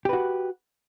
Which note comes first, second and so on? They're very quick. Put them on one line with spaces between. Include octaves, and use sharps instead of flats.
G4 B4 F#4